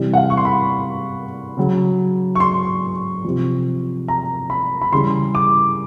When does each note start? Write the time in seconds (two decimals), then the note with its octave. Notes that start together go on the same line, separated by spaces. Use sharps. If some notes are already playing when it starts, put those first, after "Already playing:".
Already playing: C3 E3 G3
0.14 F#5
0.17 F5
0.30 C#6
0.37 C6
0.45 B5
1.57 C#3 F#3
2.35 C#6
2.40 C6
3.24 C3 F3
4.08 A#5
4.50 B5
4.82 B5
4.92 C#3 E3 G3 C6
5.35 D6